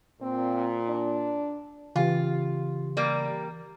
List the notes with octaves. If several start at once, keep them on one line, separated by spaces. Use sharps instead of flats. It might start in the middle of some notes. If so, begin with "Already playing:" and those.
A#2 C4
D4
C#3 E3 F4 G4
G3 A#3